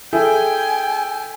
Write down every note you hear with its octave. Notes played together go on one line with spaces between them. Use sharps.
E4 G#4 A4 G5 G#5